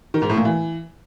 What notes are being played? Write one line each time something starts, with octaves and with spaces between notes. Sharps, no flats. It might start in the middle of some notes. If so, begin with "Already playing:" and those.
D#3
G#2
A2
A#2
E3